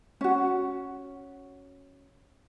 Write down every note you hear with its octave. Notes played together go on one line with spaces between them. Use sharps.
C#4 F#4